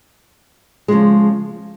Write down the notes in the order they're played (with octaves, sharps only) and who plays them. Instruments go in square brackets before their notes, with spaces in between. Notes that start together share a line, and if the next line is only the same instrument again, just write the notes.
[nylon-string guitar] C#3 F3 G#3